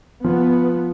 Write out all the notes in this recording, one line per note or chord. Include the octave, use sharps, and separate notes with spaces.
F3 B3